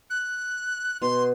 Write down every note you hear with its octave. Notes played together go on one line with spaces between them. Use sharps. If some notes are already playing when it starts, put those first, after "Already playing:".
F#6
B2 C6